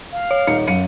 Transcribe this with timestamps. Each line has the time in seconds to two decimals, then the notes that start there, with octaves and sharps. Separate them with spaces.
0.12 F5
0.31 C#5
0.47 D#1 D#4 C#7
0.67 F#2 F5 C#7 D#7